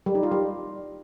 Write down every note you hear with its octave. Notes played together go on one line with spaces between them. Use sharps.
G3
D#4
F4
G3